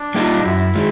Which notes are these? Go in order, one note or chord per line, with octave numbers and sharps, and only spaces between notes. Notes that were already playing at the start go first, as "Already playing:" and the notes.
Already playing: D4
G3 A#3 D#4 G4
F#2 E4
D#3 G#3